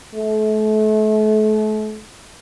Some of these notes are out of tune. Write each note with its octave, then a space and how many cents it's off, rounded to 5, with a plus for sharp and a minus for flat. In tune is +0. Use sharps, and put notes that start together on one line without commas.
A3 -35